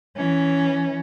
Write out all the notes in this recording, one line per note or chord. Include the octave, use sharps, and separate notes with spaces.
E3 C#4